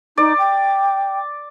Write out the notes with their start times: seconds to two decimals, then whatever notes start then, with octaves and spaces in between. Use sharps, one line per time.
0.18 D#4 D5
0.38 G5